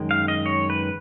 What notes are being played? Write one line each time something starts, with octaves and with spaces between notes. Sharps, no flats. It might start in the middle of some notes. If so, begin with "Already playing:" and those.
Already playing: F#2 D#3 G#3
F5
D#5
C#5
B4